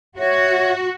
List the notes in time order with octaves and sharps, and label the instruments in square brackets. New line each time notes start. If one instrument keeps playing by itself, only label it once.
[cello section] F#4 [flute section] C#5 E5